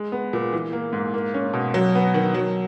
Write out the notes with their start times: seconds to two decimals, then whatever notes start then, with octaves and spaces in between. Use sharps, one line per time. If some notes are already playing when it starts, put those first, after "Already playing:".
Already playing: G#3
0.12 B3
0.33 A#2
0.53 E3
0.73 A#3
0.93 G#2
1.14 A#3
1.34 C#4
1.53 B2
1.74 F#3
1.95 B3
2.14 D#3
2.34 F#3